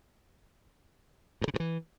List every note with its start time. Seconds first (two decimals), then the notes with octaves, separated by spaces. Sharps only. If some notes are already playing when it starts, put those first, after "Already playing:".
1.41 G2
1.48 C#3
1.54 G2
1.60 E3